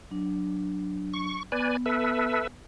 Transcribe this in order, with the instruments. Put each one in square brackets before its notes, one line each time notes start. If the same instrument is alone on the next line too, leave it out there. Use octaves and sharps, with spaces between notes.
[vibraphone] F#3 D4
[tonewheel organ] C#6
[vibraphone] B3 [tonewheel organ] B4 D5 G#5
[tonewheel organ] A4 B4 E5